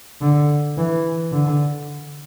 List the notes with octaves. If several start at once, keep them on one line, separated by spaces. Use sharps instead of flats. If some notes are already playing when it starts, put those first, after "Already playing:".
D3
E3
D3